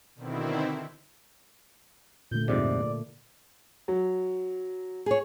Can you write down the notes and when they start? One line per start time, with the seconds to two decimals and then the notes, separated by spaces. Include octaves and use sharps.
0.15 B2 D3 D#3 C4 E4
2.31 A#2 D3 A3 G6
2.48 F2 G#2 C3 D5
3.88 F#3
5.06 G#4 C#5